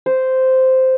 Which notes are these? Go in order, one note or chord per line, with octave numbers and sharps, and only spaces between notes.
C5